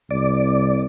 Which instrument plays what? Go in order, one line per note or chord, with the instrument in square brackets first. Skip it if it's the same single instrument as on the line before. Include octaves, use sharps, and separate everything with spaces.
[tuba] C2 [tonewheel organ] D5